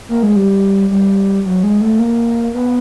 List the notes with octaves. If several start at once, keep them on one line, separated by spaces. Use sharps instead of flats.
A#3
G#3
G3
G3
F#3
G#3
A3
A#3
B3